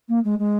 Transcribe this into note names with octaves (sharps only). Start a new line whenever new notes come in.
A#3
G#3
G#3